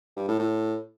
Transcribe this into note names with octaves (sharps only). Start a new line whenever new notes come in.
G2
A2
A2